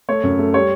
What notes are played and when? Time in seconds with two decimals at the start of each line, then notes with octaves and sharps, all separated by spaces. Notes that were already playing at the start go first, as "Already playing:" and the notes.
0.08 A3 C#5
0.23 F#2
0.39 A3
0.54 G3 C#5